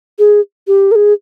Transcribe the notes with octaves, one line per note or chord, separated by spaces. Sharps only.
G#4
G4
A#4
G#4